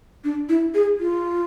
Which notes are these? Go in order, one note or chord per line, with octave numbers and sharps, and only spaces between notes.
D4
E4
G#4
F4